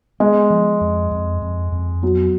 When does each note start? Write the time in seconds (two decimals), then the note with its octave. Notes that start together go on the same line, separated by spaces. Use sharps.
0.20 G#3 B3
0.50 F3
0.81 F2
1.11 F2
1.42 F2
1.72 F2
2.03 F#3 B3